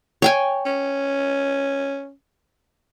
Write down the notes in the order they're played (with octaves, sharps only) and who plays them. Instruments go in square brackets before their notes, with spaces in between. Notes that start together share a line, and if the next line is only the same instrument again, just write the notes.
[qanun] C#5 G5 G#5
[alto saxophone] C#4